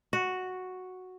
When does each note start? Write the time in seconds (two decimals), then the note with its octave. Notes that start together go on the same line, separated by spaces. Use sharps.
0.13 F#4